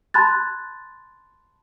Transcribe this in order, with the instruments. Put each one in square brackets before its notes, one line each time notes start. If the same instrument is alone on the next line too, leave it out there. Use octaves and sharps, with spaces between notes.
[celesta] A5 B5 C6 F#6 G#6 A6